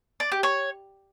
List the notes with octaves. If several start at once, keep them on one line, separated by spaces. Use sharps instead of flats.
D5
G4
C#5